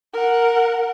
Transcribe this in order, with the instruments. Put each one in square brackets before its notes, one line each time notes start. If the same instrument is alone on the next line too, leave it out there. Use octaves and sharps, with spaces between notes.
[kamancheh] A#4 F#5